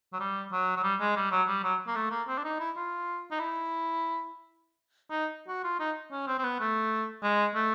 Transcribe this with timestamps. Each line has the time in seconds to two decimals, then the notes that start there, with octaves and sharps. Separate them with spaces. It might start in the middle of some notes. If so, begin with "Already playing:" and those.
0.13 F#3
0.20 G3
0.52 F#3
0.76 F#3
0.83 G3
1.00 G#3
1.16 G3
1.31 F#3
1.48 G3
1.64 F#3
1.87 A#3
1.96 A3
2.11 A#3
2.28 C4
2.38 D4
2.44 D#4
2.60 E4
2.76 F4
3.31 D#4
3.39 E4
5.11 D#4
5.48 F#4
5.64 F4
5.80 D#4
6.12 C#4
6.27 C4
6.39 C4
6.44 B3
6.60 A3
7.23 G#3
7.55 A3